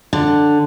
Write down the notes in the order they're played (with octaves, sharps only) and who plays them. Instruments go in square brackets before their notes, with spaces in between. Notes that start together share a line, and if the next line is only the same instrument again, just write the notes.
[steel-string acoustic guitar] D3